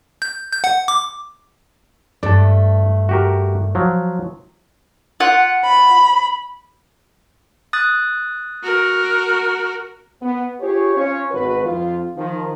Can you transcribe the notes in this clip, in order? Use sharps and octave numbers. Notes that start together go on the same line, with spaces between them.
G6
G6
F#5
D6
G2 A3 D5 A5
F#4 G4 A#4
F3 F#3
F4 F#5
B5
D#6 F#6 A6
F#4 A#4
B3
F4 G4 G#4 C#5
C#4 F4 C#5
G#1 B2 F#4 B4
F2 F4
D#3 F3